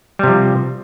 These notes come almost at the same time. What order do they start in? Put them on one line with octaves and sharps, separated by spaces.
G3 C3 F3